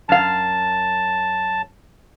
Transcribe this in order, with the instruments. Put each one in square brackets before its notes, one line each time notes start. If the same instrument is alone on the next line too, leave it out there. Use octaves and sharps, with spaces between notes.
[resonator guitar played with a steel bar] F#2 F5 [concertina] A5